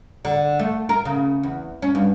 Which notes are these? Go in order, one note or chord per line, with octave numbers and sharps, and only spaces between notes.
D3
A3
A#4
C#3
E2
C#4
G2